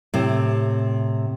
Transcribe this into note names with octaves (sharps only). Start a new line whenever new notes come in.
A2 C3